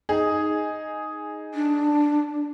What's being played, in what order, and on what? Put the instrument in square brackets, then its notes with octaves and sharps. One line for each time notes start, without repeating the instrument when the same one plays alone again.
[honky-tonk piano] D#4 G#4
[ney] D4